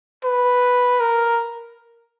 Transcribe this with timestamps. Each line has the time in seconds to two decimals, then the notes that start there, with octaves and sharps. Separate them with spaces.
0.24 B4
1.01 A#4